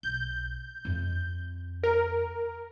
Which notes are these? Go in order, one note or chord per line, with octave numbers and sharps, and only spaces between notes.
B1 G6
F2 F4
A#4